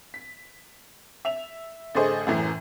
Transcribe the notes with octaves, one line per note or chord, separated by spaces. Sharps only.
B6
E5 F7
A1 D3 A3 G#4 C5 D#5
F#2 A2 E3